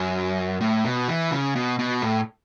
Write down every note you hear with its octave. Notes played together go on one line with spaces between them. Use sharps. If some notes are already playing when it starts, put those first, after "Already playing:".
Already playing: F#2
A2
B2
E3
C#3
B2
B2
A2